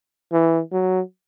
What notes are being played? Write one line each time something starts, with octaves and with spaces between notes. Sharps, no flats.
E3
F#3